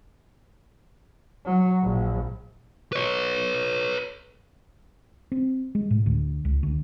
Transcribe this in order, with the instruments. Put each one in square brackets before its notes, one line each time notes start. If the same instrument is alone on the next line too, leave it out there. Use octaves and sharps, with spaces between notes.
[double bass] F#3
A#1
[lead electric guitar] B4 C#5
[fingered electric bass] C4
G#3
A2
D2
C#2
D2